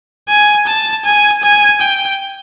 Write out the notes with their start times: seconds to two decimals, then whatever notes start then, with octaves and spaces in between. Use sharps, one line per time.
0.29 G#5
0.67 A5
1.05 G#5
1.43 G#5
1.81 G5